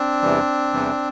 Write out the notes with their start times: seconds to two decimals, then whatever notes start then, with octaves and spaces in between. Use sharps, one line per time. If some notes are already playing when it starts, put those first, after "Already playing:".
Already playing: C4 D4
0.22 E2 C3 E3 G3
0.73 E2 C3 E3 G3